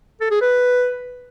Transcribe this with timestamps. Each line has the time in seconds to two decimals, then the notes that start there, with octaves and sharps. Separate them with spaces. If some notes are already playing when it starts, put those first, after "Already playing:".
0.21 A4
0.31 G#4
0.41 B4